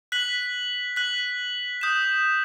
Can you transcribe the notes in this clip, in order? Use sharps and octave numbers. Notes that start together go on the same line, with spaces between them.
F#6 B6 F#7
F#6 B6 F#7
D#6 G6 B6 E7